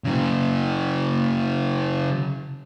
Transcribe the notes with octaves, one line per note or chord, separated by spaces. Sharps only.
C#3 F#3